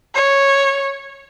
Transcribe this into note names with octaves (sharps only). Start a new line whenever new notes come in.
C#5